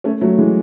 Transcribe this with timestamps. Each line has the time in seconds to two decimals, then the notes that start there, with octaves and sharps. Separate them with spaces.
0.04 A3 C#4
0.21 F#3 A3
0.38 E3 G#3